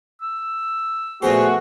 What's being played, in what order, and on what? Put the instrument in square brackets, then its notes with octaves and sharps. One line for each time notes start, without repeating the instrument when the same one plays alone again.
[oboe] E6
[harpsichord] A#2 F3 C5 [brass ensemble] A3 B3 F#4 [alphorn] G#4